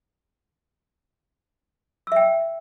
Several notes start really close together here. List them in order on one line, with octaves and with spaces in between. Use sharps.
E6 E5 G5